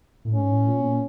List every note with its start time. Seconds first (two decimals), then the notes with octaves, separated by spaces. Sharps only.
0.25 A2
0.35 G#2 C#4
0.51 A2
0.68 A#2
0.80 B2
0.84 A#2